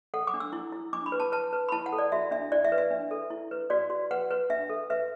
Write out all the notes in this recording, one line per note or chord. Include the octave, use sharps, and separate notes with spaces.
A4 F#5
D6
D4
E6
E4
E4
D4 D6
B5
B4
A5
B4 A5
B4
B5
E4 A5
F#5
A4
D5
F#4 E5
D4 E5
E4 D5
E5
B4
E5
D4
A4
E4
B4
F#4 D5
F#4
B4 F#5
B4
D4 E5
A4
B4 E5